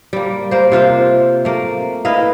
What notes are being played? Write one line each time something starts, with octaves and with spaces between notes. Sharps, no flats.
G3 A#3
A#3 C5
C3 F4 C5 E5
A3 A#3
E4 B4 D#5 F5